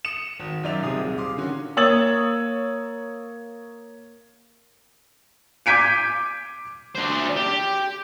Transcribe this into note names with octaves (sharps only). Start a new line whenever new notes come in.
D#6 C#7 E7
G#1
F#2 D#3 F4 D5 E5 F7
D#1 G#1 C3 G#4 D#6
F5 C6 D6
D3 D#3 C#4 F#4
A#3 C#5 D#6 E6 A6 F#7
D6 G6 G#6 B6 D7 D#7
D4 C5
G4